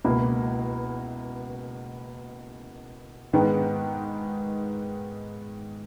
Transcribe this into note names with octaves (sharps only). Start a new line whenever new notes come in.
C#2 B2 A#3 E4
G#2 D#3 G#3 B3